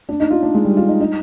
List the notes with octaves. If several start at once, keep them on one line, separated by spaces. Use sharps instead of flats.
D4
D#4
F4
D4
G#3
G3
F4
D#4
D#4